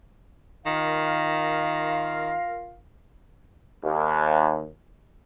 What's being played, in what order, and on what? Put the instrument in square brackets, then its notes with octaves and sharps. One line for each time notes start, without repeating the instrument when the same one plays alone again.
[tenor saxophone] D#3 [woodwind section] F4 A#4 F5
[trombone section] D#2